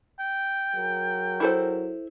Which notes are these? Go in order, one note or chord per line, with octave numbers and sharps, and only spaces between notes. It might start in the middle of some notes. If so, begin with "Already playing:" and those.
G5
F#3 G#4 A#4
E4 A4 C5